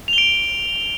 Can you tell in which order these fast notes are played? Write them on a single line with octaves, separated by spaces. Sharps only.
F7 G7 D7